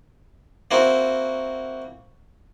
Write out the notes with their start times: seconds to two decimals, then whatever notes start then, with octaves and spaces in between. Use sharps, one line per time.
0.71 A#3 C4 E4 F#4